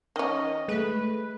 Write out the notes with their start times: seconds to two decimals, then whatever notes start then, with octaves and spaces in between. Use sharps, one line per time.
0.16 D#3 C#4 D#5
0.68 G#3 A3 B4